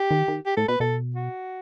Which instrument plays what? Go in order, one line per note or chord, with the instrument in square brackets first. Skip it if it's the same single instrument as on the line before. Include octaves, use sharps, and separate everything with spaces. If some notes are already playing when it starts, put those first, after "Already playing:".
Already playing: [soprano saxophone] G4
[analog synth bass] D#3
D#3
[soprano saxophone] G4
[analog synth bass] A2 [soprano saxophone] A4
[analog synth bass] B2 [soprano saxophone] B4
[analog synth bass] B2 [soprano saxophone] A4
[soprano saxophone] F#4